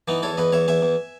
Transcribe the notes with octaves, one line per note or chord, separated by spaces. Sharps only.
E3 B3 D#4
E2 A4 C#5
E2 B4 D#5
E2 C#5 E5
E2 E5 G#5
E2